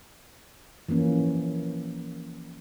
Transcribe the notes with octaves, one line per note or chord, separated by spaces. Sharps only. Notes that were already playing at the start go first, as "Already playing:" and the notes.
E3 F3 A#3 C#4